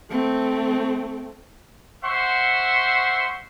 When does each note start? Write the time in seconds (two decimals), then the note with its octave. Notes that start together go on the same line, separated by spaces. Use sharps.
0.10 A3 C4
2.04 C5 E5 F#5 C6 C#6